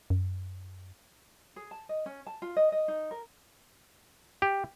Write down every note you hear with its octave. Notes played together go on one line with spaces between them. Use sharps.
F#2
G#4
A5
D#5
C#4
A5
F4
D#5
D#5
D#4
A#4
G4